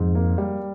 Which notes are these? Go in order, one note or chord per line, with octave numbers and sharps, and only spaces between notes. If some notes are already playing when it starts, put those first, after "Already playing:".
Already playing: F2 G#2
A#3
G3